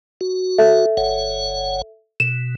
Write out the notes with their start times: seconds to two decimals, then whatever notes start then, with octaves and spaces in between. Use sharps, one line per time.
0.21 F#4
0.58 A4 E5
0.97 G1 C#5 F#5
2.20 B2 E7